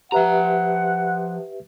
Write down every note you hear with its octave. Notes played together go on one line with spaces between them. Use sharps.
F3 G4 B4 E5 F#5 A#5